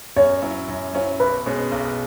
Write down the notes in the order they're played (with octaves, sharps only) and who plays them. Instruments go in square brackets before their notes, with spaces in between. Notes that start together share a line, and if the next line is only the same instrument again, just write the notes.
[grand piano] F#2 [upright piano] C#5
[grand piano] F#3 C#4 E4
F#2
F#3 C#4 E4
[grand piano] B1 [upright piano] B4
[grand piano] B2 G#3 C#4
B1